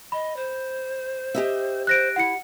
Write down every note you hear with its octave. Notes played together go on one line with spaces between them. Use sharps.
D#5 B5
C5
G4 D#5 E5
C5 F#6 A#6 D7
E4 F#5 C#7